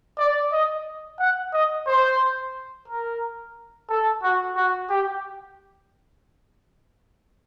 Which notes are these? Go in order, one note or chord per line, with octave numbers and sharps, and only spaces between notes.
D5
D#5
F#5
D#5
C5
A#4
A4
F#4
F#4
G4